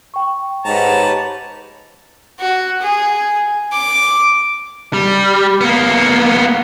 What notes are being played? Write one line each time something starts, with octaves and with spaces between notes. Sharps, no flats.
G5 C#6
G#2 G4 B4 C#5 A5 A#5
F#4
G#4
D6
G3
A#3 B3